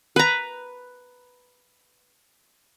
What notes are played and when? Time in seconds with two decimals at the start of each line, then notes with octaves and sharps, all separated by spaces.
0.16 B4 A#5